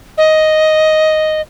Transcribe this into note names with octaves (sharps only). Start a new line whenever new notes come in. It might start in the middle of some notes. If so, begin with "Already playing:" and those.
D#5